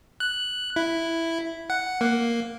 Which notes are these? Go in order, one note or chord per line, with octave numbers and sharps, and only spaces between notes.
F#6
E4
F#5
A#3